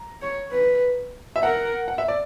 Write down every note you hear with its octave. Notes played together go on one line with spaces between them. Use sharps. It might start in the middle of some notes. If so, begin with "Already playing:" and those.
Already playing: A#5
C#5
B4
E5
A#4 F#5
F#5
E5
D5